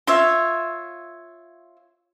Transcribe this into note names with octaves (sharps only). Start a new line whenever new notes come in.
F4 C#5 E5